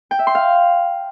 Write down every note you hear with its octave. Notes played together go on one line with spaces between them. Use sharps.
G5
E5
C6
F5